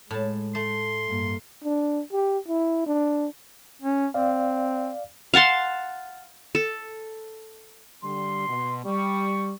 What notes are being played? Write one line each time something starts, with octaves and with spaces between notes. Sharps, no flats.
A2 G#3 A5
A3 C6
G2 A#3
D4
G4
E4
D4
C#4
C4 D5 F5
F5 F#5 A5 C6
A4
D3 G3 C6
B2
G3 C#6